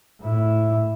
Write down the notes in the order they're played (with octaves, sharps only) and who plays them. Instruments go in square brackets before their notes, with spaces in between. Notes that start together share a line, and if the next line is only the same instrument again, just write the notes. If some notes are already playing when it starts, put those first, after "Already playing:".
[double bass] A2 E4